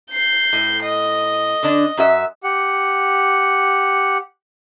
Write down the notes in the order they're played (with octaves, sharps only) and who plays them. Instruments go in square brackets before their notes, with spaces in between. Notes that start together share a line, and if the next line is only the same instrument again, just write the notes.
[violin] G6 C7
[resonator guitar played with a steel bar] A2
[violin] D#5
[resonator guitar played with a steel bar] D3 D4
F#2 F#4 E5
[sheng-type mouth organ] G4 F#5